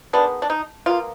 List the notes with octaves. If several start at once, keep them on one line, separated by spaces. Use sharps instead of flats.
D#3 G#3 B3 D4
D4
D#4
B2 A#3 F4